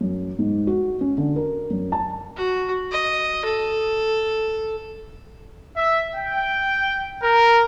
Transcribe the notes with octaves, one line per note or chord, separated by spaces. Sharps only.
F#2
G#2
F#4
C#4
D3
A#4
F#2
A5
F#4
D#5
A4
E5
G5
A#4